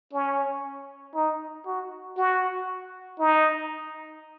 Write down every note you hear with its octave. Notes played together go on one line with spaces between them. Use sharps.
C#4
D#4
F#4
F#4
D#4